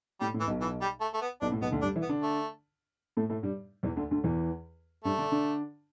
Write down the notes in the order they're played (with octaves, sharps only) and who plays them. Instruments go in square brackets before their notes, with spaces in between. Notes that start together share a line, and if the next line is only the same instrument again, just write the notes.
[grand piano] A2 [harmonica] G3
[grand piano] A2
[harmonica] E3
[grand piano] B1 B2
[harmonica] E3
G3
A3
A3
B3
[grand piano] B1 B2 [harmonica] D4
[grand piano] A2
[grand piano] B1 B2 [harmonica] B3
[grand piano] D2 D3
[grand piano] G2 G3 [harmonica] D4
[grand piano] E3 E4
[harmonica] B3
[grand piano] D3 D4
[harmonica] A3
[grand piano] A2 A3
A2 A3
G2 G3
E2 E3
D2 D3
D2 D3
E2 E3
[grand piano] G2 G3 [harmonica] A3
[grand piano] D3 D4
D3 D4